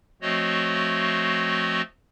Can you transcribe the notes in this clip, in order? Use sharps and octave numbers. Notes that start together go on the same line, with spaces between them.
F3 A3 C4 F#4 C#5 D#5